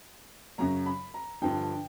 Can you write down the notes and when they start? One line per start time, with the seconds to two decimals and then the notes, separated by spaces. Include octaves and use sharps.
0.58 F#2 C#3 F#3 A#5
0.86 B5
1.14 A#5
1.42 G2 D3 F3 G5